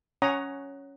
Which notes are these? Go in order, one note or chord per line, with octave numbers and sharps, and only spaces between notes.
C#4 C#5 F#5 A#5 D#6